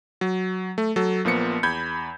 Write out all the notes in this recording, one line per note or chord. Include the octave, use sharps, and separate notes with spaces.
F#3
A3
F#3 A4
A#1 F3 A#3 B3 C#7
E2 B5 G6 G#6